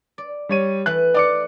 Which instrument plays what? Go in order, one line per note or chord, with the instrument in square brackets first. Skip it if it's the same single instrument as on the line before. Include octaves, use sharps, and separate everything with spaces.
[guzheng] D5
[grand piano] G3 C#5 D#7
[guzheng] E3 A3 B4 [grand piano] F#6
[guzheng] D#4 [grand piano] D5 D6 C#7